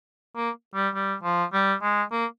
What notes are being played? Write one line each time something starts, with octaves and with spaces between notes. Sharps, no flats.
A#3
G3
G3
F3
G3
G#3
A#3